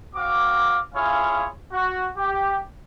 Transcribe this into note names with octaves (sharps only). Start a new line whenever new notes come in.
C4 F#4 F5 D6
C#4 E4 F4 G#4 C#5 F5
F#4
G4